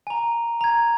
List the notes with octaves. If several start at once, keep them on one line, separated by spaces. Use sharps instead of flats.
G#5 A#5
A#5 G#6